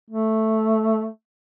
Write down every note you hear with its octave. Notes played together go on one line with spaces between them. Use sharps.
A3